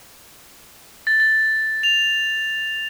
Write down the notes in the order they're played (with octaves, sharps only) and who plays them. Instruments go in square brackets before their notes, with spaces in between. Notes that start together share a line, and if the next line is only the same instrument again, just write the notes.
[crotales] A6
A6
F7